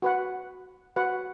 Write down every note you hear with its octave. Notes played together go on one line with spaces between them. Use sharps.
F#4 B4 F#5
F#4 B4 F#5